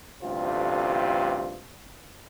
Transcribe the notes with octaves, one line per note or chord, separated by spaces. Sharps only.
A1 D2 G2 C3 F4